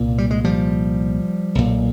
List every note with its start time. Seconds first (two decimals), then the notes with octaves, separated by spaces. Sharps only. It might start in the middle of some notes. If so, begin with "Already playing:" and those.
Already playing: C2 A#2
0.18 G3
0.31 G#3
0.45 F3 G3
1.55 B1 A#2